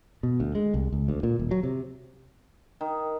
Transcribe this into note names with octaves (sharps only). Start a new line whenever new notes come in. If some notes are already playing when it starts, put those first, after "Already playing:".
B2
D2
G#3
C2
C#2
D2
A#2
D#1
F#3
C3
D#3